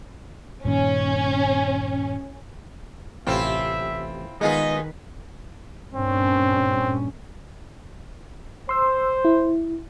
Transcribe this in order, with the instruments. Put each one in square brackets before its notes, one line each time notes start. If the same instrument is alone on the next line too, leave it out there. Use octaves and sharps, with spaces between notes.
[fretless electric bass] G2 A#2 D#3 [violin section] C#4
[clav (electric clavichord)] A1 C3 G5 [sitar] C4 E4 F4 [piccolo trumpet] E5
[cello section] D#3 B4 [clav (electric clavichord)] G#3 B3 [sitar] D#4 F4 G#4 [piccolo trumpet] D#5
[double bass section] G2 A#2 C#4 [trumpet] C4
[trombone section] C5 [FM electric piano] C6 E6
[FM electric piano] E4